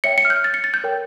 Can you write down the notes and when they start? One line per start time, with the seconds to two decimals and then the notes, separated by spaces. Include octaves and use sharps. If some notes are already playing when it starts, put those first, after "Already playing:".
0.04 C#5 E5 G5 C#7
0.18 C#7
0.25 F6
0.30 G6
0.44 A6
0.54 C#7
0.64 A6
0.74 G6
0.84 A#4 C#5 G5